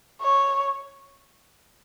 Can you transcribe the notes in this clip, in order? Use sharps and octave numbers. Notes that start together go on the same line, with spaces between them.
C#5